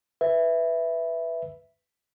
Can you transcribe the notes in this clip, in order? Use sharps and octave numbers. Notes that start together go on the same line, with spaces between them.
B4 E5